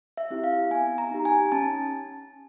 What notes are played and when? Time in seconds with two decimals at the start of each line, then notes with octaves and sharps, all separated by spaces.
0.17 E5
0.30 C4 E4 G4
0.44 F5
0.71 B3 G#5
0.98 A#5
1.11 D#4 G4
1.25 G#5
1.52 C#4 A5